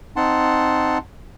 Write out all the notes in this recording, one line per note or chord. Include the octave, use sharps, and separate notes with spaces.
C4 D#4 F#5 A5 C6